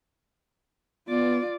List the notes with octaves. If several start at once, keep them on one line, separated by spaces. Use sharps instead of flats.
B3 F4 D5